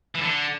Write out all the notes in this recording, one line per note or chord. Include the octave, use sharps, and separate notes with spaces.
E3
D3